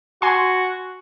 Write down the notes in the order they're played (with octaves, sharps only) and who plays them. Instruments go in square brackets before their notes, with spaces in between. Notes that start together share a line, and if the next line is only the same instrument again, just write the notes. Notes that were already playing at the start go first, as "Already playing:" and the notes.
[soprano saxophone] F#4 [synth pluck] G#5 C6